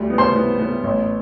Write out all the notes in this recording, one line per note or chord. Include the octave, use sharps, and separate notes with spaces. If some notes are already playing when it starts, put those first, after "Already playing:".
Already playing: D2 G3
B3
C5 C6
B3
B3
A1